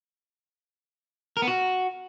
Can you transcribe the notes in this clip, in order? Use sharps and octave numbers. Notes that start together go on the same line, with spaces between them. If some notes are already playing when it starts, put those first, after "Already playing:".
A#4
B3
F#4